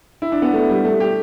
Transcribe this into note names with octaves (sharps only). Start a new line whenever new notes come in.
E4
D4
B3
A3
G3
A3
G4